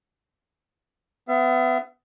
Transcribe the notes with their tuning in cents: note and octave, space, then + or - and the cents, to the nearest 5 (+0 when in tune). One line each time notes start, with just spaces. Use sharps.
B3 +30 E5 +40